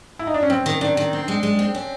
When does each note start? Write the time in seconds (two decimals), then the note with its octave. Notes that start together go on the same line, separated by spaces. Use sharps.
0.19 E4
0.27 D#4
0.34 D4
0.43 C#4
0.50 G2 C4
0.66 D#3
0.81 D#3 D4
0.97 D#3
1.13 C4
1.28 G#3
1.43 G#3
1.59 C4
1.75 C#4